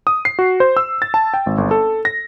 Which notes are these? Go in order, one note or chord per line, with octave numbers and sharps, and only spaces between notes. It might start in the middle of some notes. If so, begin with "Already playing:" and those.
D#6
C7
F#4
C5
E6
A6
A5
G5
G#1
G1
A4
A#6